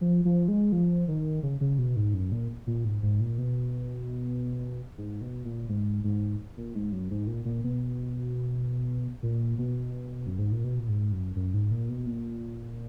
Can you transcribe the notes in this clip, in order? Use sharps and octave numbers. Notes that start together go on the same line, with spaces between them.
F3
F3
G#3
F3
D#3
C#3
C#3
B2
G#2
F#2
A#2
A#2
G#2
G#2
A#2
B2
G#2
B2
A#2
G#2
G#2
A#2
G#2
F#2
G#2
A#2
A#2
B2
A#2
B2
F#2
G#2
A#2
B2
A#2
G#2
F#2
F#2
G#2
A#2
B2
A#2